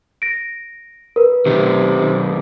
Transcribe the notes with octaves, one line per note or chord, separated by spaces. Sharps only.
A#6 D7
A#4 B4
B1 C3 D#3